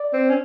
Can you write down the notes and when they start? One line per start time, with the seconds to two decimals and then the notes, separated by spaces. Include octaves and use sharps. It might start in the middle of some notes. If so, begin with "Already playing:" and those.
Already playing: D5
0.13 C4
0.29 C#4